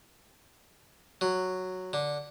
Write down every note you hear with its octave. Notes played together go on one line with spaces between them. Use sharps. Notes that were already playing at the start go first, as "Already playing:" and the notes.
F#3
D3